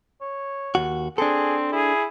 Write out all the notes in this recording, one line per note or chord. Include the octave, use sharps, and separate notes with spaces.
C#5
D#2 F#4
C4 D4 G#4 A4
E4 G#4